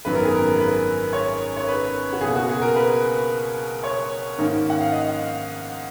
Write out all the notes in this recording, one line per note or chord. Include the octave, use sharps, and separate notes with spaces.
G#1 F#2 D#3 F#3 B3 B4
A#4
G#4
A#4
B4
C#5
C#5
B4
F#4
C#2 B2 A#3 G#4
F#4
G#4
A#4
B4
C#5
G#2 D#3 A#3 C#4
F#5
F5
D#5